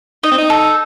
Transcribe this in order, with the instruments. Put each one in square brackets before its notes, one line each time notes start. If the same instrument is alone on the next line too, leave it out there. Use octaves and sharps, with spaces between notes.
[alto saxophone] D#4 [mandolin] D#5
[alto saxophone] C4
D#4
[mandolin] A4